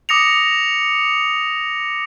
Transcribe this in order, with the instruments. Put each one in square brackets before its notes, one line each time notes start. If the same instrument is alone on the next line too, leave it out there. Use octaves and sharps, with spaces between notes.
[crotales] D6 D#6 A#6 C#7 F7